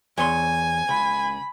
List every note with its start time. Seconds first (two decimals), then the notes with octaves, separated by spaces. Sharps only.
0.18 E2 C#5 G#5 C6
0.89 C#2 B5